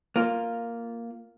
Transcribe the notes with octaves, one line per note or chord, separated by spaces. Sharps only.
A#3 F4